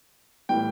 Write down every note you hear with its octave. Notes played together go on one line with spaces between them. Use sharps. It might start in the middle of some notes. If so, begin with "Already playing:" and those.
A2 E3 G3 G5